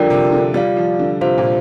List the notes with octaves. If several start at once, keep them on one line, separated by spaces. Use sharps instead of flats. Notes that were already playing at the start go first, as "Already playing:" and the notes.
Already playing: D3 F3 G3 F4 A#4 D5 G5
C3
D3
G3 F4 D5 F5
F3
D3
C3 F4 C5 F5
A#2